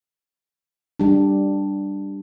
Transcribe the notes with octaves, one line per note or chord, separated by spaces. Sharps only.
G3 D4